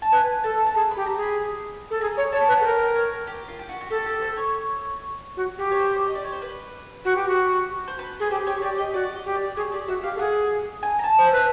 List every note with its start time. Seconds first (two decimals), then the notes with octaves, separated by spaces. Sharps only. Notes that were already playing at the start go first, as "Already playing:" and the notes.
0.02 A5
0.12 B4 G#5
0.44 A4 A5
0.66 A5
0.75 G#4 A#5
0.91 B5
0.96 G4
1.06 A#5
1.17 G#4
1.23 B5
1.90 A4
2.01 G#4 A#5
2.17 C#5
2.32 C#5 A5
2.48 B4
2.55 F#5
2.60 A4
2.64 A#4 G5
2.95 C#5
3.27 G4
3.48 F4
3.59 G4
3.69 F#4
3.81 F#4
3.90 G4 A4
4.06 G4
4.21 C5
4.37 C#5
5.37 F#4
5.58 G4
5.71 C#5
5.79 C5
6.06 D#5
6.15 D5
6.24 C#5
6.32 C5
6.42 B4
7.05 F#4
7.16 G4
7.27 F#4
7.88 C5
7.99 B4
8.20 G#4
8.31 G4 C5
8.46 G4 C#5
8.62 G4 D5
8.77 G4 D#5
8.94 F#4 D5
9.15 D#5
9.26 G4
9.36 D5
9.57 G#4 C#5
9.72 G4 D5
9.88 F#4 E5
10.04 G4 F5
10.16 A4
10.19 G#4 F#5
10.83 G#5
10.99 A#5
11.04 A5
11.18 C5
11.25 E5
11.32 B4